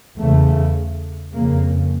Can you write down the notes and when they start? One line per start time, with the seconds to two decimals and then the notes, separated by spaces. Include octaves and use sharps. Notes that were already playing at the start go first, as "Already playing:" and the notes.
0.18 E2 C#3 A3
1.33 F2 C#3 A#3